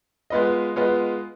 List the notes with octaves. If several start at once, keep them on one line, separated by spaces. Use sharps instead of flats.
G#3 B3 F4 B4 D#5
G#3 B3 F4 B4 D#5